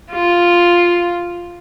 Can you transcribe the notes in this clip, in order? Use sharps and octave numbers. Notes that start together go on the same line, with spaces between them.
F4